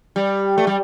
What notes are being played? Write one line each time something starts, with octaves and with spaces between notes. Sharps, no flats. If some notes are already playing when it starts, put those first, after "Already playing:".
G3
A3
G3